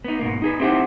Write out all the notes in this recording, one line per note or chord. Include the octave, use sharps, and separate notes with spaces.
B3 D#4
G#2 B2 A#3
D#4 G#4 B4
C4 D#4 E4 G4 C5 F#5